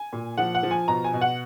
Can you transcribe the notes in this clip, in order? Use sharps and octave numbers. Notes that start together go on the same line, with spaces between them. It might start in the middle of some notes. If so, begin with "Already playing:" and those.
Already playing: G#5
A#2
F3 F#5
F#5
F3
G#5
B2 A#5
G#5
B2
F#5